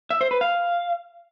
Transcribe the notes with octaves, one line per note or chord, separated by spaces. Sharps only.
E5
C5
B4
F5